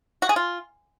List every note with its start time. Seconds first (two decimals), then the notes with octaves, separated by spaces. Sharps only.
0.22 F#4
0.29 G#4
0.36 F4